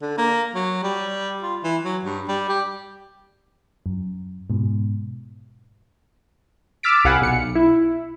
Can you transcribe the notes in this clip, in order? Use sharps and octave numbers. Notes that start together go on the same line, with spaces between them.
D3
A#3
F#3
G3
F4
E3
F#3
G2
G3
G4
F#2
G#2 B2
D6 E6 F6 A6 B6 D7
C2 F5 F#5 G#5 B5
B1 C#7
E4